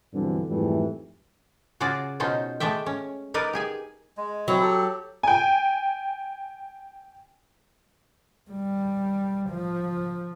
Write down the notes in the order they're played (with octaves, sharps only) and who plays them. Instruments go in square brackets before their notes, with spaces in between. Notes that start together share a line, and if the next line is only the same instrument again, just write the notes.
[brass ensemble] B1 G2 D3 E3 C4
F2 G#2 E3 G3 A3
[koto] C#3 F4 F#4 G#4 D5
B2 C#4 D#4 F4 C5
G#3 A3 D5 E5 G5
C#4
D#4 A#4 B4 D5 D#5
G4 G#4 G#5
[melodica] G#3
[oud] F#3 [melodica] C4 E4
[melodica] G4 A4
[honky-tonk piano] G5 G#5
[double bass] G3
F3